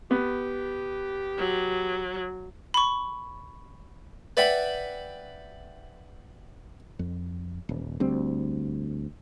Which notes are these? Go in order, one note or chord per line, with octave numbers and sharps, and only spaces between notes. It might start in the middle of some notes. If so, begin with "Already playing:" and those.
B3 G4
F#3
B5 C#6
B4 D5 E5 F#5 G5 B5
F2
D#1
D2 G3 C4